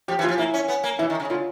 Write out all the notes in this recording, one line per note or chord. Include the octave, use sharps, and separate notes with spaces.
F3 G4
E3
F4
F3
A#3 E4
C#4
B3
A#3
E3 E4
D#3
C#3
D3 F4